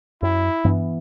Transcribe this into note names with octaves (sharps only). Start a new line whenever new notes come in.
F#2 E4
G2 E3 B3